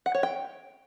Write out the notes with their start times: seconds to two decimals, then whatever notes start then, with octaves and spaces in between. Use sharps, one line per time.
0.06 F#5
0.15 C#5
0.23 G5